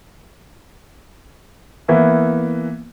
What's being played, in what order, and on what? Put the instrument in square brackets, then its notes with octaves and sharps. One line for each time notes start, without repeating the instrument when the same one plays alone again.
[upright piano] E3 A#3 B3 E4